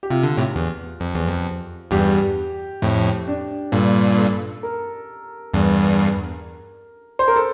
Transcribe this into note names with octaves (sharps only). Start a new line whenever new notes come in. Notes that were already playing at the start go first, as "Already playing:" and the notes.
G4
C3 F4
D3
A2 C3
E2
F2
E2
F2
E2 G2 G4
F2 A2
D4
G2 A#2 A4
A4
A#4
E2 G2
C5
A#4
A4